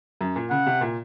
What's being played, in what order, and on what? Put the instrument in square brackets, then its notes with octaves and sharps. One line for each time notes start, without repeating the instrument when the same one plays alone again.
[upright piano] F#2
A#2
[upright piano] C#3 [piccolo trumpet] F#5
[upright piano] C3
A#2